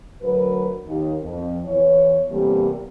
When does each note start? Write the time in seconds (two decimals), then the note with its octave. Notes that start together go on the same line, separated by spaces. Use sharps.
0.21 D2 F#3 A#4 B4
0.87 D#2
1.22 F2
1.65 E2 E3 C#5
2.30 E2 C3 G3 A3 A#3